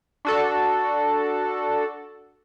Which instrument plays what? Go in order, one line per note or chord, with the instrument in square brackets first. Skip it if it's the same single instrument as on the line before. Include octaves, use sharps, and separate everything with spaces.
[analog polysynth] D4 F#4 A4